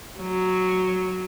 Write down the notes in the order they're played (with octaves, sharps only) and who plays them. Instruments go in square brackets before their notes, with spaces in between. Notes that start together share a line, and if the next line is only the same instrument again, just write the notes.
[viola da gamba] F#3